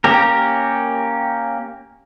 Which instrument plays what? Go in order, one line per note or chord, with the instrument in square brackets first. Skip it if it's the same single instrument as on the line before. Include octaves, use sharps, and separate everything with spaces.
[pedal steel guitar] A#3 C#4 G4 A#4